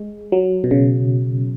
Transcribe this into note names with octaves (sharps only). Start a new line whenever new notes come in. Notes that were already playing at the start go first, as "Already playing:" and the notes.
Already playing: G#3
F#3
B2
C#3